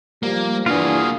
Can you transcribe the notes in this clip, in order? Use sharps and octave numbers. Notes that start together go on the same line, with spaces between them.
F3 G3 A#3
E3 A#3 D4 F4 F#4 G#4